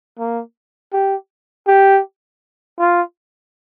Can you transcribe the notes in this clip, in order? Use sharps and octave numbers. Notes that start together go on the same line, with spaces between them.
A#3
G4
G4
F4